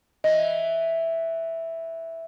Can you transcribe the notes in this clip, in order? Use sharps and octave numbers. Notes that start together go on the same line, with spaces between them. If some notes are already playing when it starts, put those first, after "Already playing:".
E3 D#5